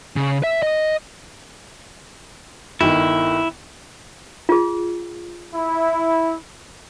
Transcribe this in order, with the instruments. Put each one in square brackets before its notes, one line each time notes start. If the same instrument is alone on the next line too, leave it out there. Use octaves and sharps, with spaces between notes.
[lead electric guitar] C#3
E5
D#5
[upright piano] G1 D#3 [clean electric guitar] E4
[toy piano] F4 G#4
[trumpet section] E4